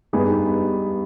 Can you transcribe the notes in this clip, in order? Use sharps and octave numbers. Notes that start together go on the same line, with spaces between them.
G2 G3 B3 D#4 G#4